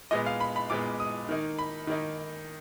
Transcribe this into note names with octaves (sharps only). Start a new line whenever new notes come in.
A#2 G#3 B3 D#5
F5
B5
B5
A#2 G#3 B3 D6
D#6
D#3 A#3 D#4
B5
D#3 A#3 D#4